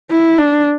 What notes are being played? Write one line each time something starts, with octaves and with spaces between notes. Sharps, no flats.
E4
D4